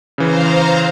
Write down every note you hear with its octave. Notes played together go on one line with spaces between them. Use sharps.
C#3 E3 C5 F5 A#5